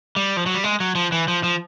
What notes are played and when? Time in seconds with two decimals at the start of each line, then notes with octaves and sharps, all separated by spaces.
0.16 G3
0.37 F3
0.46 F#3
0.54 G3
0.64 G#3
0.80 F#3
0.95 F3
1.12 E3
1.28 F3
1.43 F3